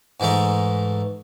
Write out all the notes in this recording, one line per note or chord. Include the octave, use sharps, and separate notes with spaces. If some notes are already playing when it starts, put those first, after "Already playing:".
G#2 E3 A3 D#4